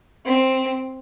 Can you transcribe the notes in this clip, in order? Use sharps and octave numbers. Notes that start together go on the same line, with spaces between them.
C4